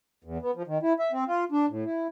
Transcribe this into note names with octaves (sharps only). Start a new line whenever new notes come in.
E2
B3
F3
D#3
E4
E5
C4
F4
D4
A2
E4